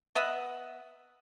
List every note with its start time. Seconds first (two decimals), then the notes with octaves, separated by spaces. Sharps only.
0.15 B3 D#5 E5 F#5